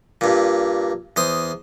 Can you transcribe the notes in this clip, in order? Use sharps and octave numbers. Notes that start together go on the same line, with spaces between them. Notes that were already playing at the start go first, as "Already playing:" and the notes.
G2 A#2
E2 C5 D#6